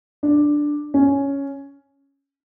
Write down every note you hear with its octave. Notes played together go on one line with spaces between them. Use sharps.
D4
C#4